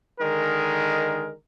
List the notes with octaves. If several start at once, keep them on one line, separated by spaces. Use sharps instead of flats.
D3 D#3 G#3 A#4